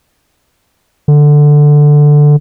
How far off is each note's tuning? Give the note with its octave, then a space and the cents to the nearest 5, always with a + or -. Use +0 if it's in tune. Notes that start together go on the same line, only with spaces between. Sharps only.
D3 +5